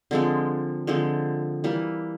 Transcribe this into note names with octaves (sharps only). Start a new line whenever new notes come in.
D3 F3 G#3 C4
D3 F3 G#3 C4
E3 G3 A#3